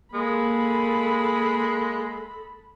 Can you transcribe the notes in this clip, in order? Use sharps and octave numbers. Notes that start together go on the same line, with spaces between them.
G#3 A#3 A4 B5